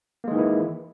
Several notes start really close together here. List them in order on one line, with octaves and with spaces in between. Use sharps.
A#3 G#3 D#3 E3 E4